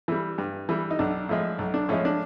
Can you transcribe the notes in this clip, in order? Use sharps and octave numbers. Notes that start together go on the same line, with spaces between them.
E3 G3
G2
E3 G3
D#4
B1 D4
A2 F3 G#3
B1
D4
A2 F3 G#3 C#4
D4